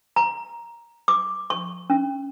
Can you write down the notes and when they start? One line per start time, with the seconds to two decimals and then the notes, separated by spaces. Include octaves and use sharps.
0.16 A#5
1.08 D6
1.50 C#6
1.90 C#4